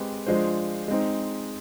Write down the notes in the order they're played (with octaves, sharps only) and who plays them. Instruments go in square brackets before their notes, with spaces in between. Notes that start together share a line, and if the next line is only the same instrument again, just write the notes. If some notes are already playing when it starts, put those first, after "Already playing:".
Already playing: [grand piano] G#3 C4 G4 B4
F3 G#3 D4 F4 C5
G#3 C4 D#4